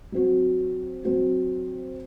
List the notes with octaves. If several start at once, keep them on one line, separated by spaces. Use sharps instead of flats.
F#3 C4 F#4
F#3 C4 F#4